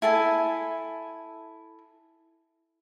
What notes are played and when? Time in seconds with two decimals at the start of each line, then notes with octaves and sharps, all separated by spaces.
0.02 E4 A4 G#5 A5